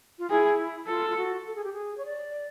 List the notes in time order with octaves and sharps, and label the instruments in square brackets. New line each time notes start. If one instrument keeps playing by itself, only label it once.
[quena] F4
[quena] E4 [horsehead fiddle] G#4
[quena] F4 [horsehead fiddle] A4
[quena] F4
F#4
A4
G#4
G4
G#4
C#5
D5